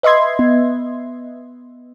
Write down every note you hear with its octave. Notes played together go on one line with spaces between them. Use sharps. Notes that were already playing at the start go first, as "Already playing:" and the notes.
B4 D#5 E5 C6 G#6
B3